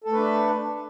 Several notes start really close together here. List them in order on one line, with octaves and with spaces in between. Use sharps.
A4 A3 B4 D4